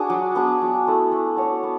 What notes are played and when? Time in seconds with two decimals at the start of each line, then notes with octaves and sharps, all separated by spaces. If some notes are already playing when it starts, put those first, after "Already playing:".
Already playing: D4 F#4 G#4
0.10 F#3
0.35 B3 D4 G#4
0.62 F#3
0.87 A3 E4 A4
1.12 A3
1.37 D4 F#4 C#5
1.63 B3